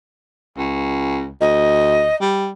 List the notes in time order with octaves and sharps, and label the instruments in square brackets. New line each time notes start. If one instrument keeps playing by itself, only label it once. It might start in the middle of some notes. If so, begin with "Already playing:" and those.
[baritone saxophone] C#2
[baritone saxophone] D2 [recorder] D#5
[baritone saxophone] G3